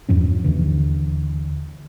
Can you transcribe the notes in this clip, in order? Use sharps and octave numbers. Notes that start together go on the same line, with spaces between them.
E2 G2 F3 C#4
D#2 D3 E3